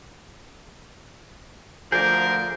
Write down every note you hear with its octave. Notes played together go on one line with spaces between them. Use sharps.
D2 F3 G#4 A#4 D5 G6